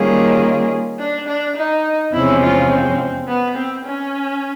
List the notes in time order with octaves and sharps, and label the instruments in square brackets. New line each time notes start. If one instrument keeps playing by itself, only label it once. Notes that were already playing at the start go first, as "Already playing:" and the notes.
Already playing: [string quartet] D#3 G3 A#3 C#4 F4 [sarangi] G#4
[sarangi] D4
D4
D#4
[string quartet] E2 C3 F3 G#3 C#4 [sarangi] E4
[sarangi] F4
C4
B3
C4
C#4